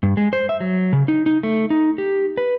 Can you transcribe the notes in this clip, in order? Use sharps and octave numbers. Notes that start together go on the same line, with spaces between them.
G2
G#3
C5
E5
F#3
C#3
D#4
D#4
A3
D#4
G4
B4